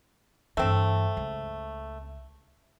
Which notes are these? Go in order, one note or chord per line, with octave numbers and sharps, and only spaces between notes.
G2 E3 A3 C4
C#2